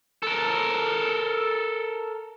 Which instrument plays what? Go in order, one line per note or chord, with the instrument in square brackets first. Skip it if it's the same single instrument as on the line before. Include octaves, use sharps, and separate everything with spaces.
[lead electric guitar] A4 A#4